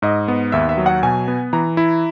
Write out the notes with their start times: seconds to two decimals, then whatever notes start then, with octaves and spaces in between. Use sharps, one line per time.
0.02 G#2 D#5
0.28 B3
0.52 D#2 E5
0.69 E5
0.78 F#3
0.86 F#5
1.03 B2 G#5
1.28 B3
1.53 E3 A#5
1.77 E4